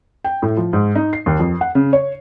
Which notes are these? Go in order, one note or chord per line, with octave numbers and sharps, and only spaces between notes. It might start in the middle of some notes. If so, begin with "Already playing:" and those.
G5
A2
F3
G#2
D#4
C7
D#2
F2
F#5
C#3
C#5